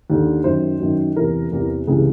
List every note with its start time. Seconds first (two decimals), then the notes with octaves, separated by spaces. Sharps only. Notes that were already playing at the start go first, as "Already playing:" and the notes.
0.10 D#2 D3
0.44 F#2 D#3 C5
0.80 F#2 D#3
1.16 E2 C3 E3 A#4
1.52 E2 C3 E3
1.87 C#2 C3 E3 G#4